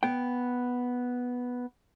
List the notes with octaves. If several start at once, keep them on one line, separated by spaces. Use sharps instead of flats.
B3 G5